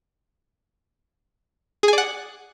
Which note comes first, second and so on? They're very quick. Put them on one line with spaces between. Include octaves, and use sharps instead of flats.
G#4 G#5 D5 F#5